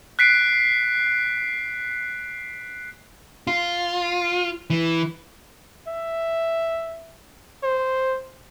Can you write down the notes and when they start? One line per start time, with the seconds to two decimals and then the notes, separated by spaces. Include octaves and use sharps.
0.19 F#6 B6 C7 D7
3.47 F4
4.70 E3
5.87 E5
7.63 C5